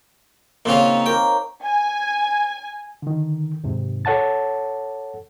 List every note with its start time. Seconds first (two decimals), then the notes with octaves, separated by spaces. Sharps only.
0.65 A#2 C#3 C4 F4 C#5
0.80 D#4
1.06 A#3 A#4 G5 C#6
1.63 G#5
3.02 D3 D#3
3.64 D#2 G#2 C3
4.05 A4 C#5 F#5 A5 A6